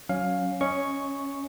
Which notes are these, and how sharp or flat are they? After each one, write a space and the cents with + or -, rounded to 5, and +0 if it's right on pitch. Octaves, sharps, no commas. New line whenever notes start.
F#3 +0 C#4 +0 F5 +15
C#4 +0 D#5 +15 C#6 +0